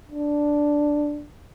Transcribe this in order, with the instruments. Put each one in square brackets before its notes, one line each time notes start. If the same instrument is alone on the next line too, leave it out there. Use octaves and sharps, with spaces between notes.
[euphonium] D4